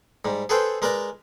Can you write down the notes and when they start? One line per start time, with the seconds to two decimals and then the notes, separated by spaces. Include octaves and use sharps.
0.25 G#2 G3
0.49 G#4 A4 B4 C5 G5
0.82 G#3 A#4 B4 D5 A#5